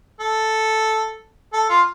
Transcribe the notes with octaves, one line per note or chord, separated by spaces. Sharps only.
A4
A4
F4